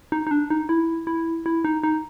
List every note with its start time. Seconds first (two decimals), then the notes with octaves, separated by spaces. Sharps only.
0.12 D#4
0.27 D#4
0.31 D4
0.50 D#4
0.69 E4
1.07 E4
1.46 E4
1.64 D#4
1.83 D#4